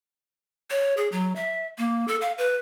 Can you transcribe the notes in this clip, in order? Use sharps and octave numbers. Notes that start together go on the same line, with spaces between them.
C#5
G#4
F#3
E5
A#3
A4
F5
B4